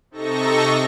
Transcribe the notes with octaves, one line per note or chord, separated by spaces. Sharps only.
C3 D#4 A4 C#6 A#6